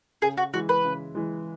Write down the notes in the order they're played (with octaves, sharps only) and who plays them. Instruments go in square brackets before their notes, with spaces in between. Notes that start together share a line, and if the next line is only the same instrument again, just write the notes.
[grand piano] C#3 [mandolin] G#4
[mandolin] F#4
[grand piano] E3 G#3 [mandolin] F#4
[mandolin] B4
[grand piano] C#3
E3 G#3